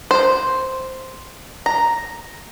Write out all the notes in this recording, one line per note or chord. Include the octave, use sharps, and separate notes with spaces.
C5
A#5